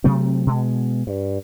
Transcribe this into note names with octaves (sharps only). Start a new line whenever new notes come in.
C3 F#3 A3 C4
B2 G#3
G2